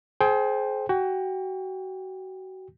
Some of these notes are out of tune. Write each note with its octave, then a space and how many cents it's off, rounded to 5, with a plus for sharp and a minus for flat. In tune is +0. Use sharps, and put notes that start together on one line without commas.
G#4 +35 C5 +5 G5 +5
F#4 +30 G5 +30